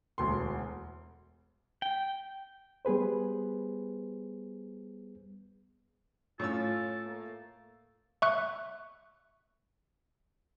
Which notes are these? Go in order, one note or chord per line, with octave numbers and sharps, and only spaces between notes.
E1 D2 C6
G5
G3 B3 G#4 B4 C5
A2 C#4 F4 A4 E6
A3 A#3
E5 C#6 F#6